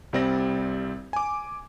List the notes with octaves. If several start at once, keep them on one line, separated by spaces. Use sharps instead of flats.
C2 G3 C4 D5 A#6
G#5 D6